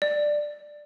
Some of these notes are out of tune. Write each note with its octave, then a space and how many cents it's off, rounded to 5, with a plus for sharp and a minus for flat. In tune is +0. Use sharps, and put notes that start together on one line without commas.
D5 +10